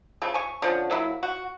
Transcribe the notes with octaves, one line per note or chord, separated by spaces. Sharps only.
C#3 F3 A3
G#5 C#6
D3 F3 C#4
F#3 A#3 E4
F#4